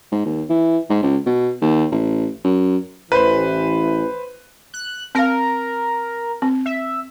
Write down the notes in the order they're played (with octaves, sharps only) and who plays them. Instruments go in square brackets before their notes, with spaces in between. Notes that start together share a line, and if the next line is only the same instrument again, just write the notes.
[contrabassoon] G#2
D#2
E3
G#2
C#2
B2
D#2
A1
F#2
[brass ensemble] A1 E3 [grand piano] B4 C5
[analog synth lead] F#6
[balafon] C4 F5 [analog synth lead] A#4
[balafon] C4
[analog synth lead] E5